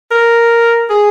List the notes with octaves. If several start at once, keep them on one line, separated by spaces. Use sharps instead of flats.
A#4
G#4